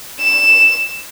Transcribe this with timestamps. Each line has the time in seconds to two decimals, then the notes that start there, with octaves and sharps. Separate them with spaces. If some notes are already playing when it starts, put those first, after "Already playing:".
0.21 E7